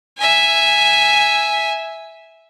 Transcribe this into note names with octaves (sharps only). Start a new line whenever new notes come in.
E5 G#5